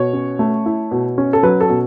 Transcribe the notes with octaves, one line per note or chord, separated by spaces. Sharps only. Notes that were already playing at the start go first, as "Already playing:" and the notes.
Already playing: B2 C#5
C#4
A3
E4
B2
C#4
A4
F#3 B4
A4
B2